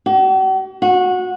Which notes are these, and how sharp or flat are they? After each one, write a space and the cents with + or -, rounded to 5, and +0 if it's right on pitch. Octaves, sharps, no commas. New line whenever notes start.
F#4 +45
F#4 -20